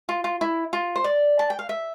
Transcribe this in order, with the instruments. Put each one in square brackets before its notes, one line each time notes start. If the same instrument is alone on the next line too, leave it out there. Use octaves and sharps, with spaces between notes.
[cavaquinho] F4
F4
E4
F4
C5
D5
A5
G5
F5
E5